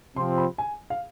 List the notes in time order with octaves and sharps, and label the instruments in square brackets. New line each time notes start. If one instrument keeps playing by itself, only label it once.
[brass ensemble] C3 F3 C4 [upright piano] C6
[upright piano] B5
G#5
F5